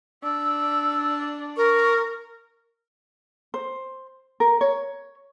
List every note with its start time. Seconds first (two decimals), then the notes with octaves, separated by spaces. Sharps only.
0.23 D4 E6
1.57 A#4 C#6
3.54 C5
4.40 A#4
4.61 C#5